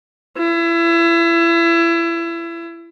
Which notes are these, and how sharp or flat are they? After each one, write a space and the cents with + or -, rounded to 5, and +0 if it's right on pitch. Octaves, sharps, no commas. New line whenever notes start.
E4 +30